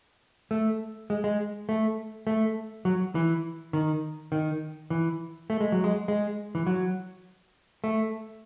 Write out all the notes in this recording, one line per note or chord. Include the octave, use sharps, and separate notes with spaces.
A3
G#3
G#3
A3
A3
F#3
E3
D#3
D#3
E3
A3
G#3
F#3
G#3
G#3
E3
F#3
A3